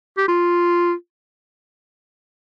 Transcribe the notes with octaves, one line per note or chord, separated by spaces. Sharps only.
G4
F4